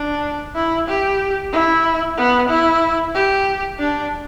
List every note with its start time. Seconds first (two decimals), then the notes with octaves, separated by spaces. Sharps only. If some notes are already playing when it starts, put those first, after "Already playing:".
Already playing: D4
0.55 E4
0.88 G4
1.52 E4
2.17 B3
2.49 E4
3.15 G4
3.79 D4